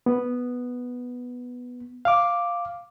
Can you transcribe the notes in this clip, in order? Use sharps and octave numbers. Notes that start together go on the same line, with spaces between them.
B3
F5 D6